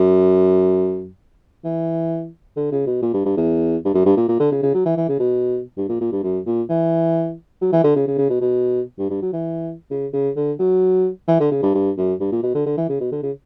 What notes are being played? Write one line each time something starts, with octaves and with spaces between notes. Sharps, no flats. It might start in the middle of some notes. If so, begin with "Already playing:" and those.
Already playing: F#2
E3
D3
C#3
B2
A#2
G2
G2
E2
G2
F#2
G2
A#2
A#2
D3
C#3
C#3
F#3
E3
E3
C#3
B2
G2
A#2
A#2
G2
F#2
A#2
E3
F#3
E3
D3
C#3
C#3
C#3
B2
B2
G2
G2
F#3
E3
C#3
C#3
D3
F#3
E3
D3
C#3
G2
G2
F#2
G2
A#2
B2
D3
D3
E3
C#3
B2
D3
C#3